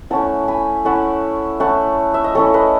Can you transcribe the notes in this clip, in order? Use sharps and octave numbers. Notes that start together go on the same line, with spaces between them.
A3 C#4 E4 F#5 A5
G#5 B5
A3 C#4 E4 F#5 A5
A3 C#4 E4 F#5 A5
E5
D#5
A3 C#4 E4 A4 C#5
B4 D#5